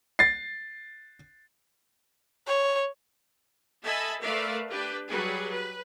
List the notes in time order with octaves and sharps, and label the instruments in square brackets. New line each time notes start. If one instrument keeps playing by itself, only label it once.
[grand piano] A6 C7
[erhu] C#5
[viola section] A4 D#5 E5 G#5 A5 B5
A3 A#4 B4 D5 E5 F5
D4 G4 B4
F#3 G3 G#4 B4
B4